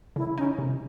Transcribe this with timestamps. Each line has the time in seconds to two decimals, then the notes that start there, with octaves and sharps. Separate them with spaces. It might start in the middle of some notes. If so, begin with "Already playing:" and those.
0.16 C#3 E4
0.37 C#4 D#4
0.58 C3